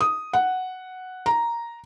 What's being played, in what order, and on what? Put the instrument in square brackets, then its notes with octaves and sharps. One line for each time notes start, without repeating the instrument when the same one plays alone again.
[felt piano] D#6
F#5
A#5